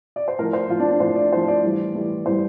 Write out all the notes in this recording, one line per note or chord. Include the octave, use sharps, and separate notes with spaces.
D5
C5
A2 F3 A#4
C5
A2 F3 F4
D4
D4
A2 F3 C5
D5
A2 F3 C5
D5
A2 E3 G3
A2 E3 G3
A2 E3 G3 C5